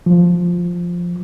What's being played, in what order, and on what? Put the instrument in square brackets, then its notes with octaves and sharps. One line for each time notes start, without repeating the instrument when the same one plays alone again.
[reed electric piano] F3